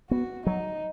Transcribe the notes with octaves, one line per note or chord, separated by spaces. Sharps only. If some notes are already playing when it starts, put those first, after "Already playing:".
B3 F#4
F#3 D#4